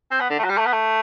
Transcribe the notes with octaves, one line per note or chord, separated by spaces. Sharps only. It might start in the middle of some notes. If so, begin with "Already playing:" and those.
C4
B3
D3
A3
F#3
G3
A3
B3
A3